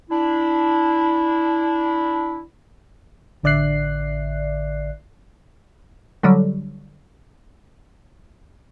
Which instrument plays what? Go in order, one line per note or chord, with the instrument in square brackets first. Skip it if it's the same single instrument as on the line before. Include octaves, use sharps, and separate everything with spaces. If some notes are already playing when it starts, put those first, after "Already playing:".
[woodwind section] D4 E4
[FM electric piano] A1 D3 D5 E5 F#6 C7
[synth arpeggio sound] D3 F#3 G3